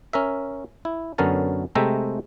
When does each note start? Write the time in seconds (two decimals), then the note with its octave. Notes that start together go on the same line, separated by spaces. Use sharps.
0.13 C#4 A#4 E5
0.85 E4
1.18 F#2 D3 B3 C#4 A#4 A5
1.75 C3 G#3 A3 E5 G5 A#5